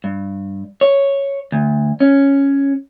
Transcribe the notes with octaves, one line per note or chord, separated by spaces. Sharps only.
G2
C#5
D2
C#4